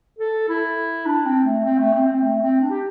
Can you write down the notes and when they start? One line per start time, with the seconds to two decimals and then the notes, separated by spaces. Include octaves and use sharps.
0.19 A4
0.49 E4
1.06 D4
1.26 C4
1.45 A3
1.64 C4
1.78 A3
1.93 C4
2.08 C4
2.22 A3
2.42 C4
2.61 D4
2.70 G4